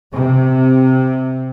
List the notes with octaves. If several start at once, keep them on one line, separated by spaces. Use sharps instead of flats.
C3